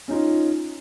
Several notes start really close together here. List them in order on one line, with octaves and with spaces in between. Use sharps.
C#4 D#4 F4